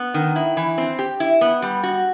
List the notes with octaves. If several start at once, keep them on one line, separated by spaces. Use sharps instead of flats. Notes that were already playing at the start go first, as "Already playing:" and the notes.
Already playing: B3
D#3
E4
E3
C4
G4
E4
B3
G3
F#4